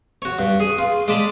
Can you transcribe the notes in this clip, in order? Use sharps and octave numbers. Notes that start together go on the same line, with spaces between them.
F#4 C#5
G2
G#4
F4
G#3 D5 A5 B5